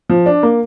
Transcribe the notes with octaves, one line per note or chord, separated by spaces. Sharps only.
F3
D4
A#3